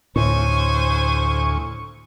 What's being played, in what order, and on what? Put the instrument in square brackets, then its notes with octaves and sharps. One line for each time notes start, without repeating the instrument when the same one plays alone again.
[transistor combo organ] D2 C#6 [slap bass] A2 [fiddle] C5 G#5